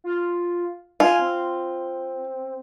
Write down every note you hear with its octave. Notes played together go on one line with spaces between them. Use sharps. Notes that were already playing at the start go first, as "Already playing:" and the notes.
F4
F4 G#5
C4